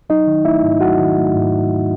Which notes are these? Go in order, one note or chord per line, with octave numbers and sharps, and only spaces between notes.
F#3 D#4 D#5
D#3
A3 E4 E5
G#2
F#3 F#4 F#5
D#3
A3
G#2